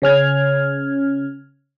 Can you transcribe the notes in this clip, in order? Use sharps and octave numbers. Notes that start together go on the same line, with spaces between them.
C#3 C#4 F6 G#6